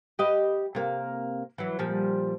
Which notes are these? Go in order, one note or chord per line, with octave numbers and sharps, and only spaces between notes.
G4 B4 D#5
C3 A#3
E3 F#3
A#2 F3 G3